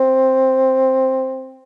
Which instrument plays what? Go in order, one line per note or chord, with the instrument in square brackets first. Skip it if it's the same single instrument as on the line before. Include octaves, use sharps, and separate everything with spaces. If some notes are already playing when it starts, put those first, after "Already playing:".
Already playing: [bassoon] C4